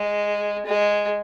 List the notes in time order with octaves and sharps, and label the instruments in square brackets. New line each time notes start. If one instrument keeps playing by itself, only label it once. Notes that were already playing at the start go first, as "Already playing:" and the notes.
Already playing: [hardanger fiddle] G#3
G#3